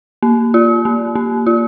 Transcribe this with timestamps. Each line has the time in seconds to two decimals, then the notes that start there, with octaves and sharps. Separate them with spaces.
0.23 A#3
0.54 F4
0.85 A#3
1.15 A#3
1.47 F4